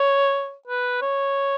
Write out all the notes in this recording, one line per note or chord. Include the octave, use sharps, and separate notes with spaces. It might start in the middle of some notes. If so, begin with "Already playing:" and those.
Already playing: C#5
B4
C#5